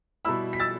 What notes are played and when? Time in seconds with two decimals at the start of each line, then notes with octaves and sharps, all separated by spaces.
0.25 B2 G3 E4 B5 E6
0.53 B6
0.60 E6 A6